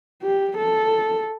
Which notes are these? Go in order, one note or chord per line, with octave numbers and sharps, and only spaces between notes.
G4
A4